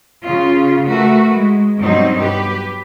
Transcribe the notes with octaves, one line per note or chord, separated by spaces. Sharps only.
C#3 F4
A3 F#4 A#4 B4
G#3
G2 B2 F#3 C4 D#4
G4 B4